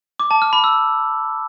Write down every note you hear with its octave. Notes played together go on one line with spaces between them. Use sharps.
D6
A5
F6
B5
E6